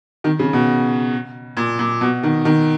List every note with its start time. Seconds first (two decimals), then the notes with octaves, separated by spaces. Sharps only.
0.24 D#3
0.39 C#3
0.53 B2
1.57 A#2
1.79 A#2
2.01 B2
2.23 D#3
2.45 D#3